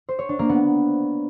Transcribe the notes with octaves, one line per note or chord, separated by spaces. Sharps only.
C5
C#5
D4
A#3
B3